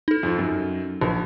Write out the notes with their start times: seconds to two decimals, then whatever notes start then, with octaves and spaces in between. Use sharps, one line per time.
0.08 D#4 A4
0.23 F2 F3
0.39 F#2
1.01 A#1